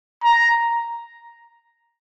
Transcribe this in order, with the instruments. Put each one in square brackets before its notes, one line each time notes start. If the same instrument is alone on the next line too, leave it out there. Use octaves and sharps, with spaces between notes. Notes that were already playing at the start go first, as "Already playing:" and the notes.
[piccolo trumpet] A#5